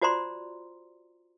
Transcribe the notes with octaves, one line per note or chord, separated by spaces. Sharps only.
F4 F#4 C5 D5 A#5 C6